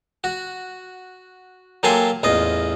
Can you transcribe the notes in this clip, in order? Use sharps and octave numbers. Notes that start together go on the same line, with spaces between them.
F#4
F#3 A#3 G4 A4 G#5 C6
A1 E2 F4 D#5